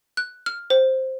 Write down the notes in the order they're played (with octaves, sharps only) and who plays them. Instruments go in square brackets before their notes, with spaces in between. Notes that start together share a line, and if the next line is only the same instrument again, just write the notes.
[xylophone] F#6
F6
C5